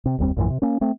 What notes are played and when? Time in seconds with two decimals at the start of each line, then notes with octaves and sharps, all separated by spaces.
0.06 C3
0.18 F#1 D#2 G3 C4
0.37 A#1 F#2 A2 E3
0.50 C3
0.62 A#3 C#4
0.81 A3 C4